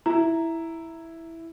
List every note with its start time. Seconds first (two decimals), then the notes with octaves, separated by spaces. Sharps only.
0.06 E4 A#5